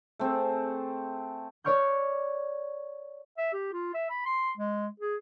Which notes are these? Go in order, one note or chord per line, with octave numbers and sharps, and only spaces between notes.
A3 C4 G#4 A4
C#5 D5 C#6 F6 G6
E5
G4
F4
E5
B5
C6
G#3
G#4